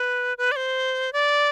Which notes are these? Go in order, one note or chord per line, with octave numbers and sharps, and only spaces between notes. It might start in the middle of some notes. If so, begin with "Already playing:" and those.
Already playing: B4
B4
D5
C5
D5